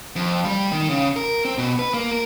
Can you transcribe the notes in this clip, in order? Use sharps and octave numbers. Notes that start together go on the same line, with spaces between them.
F2
G3
D#3
C#3
A#4
C4
B2
B4
A#3
A#4